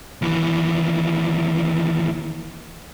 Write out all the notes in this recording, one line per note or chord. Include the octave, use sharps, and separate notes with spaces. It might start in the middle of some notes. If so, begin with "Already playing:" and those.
D#2 E3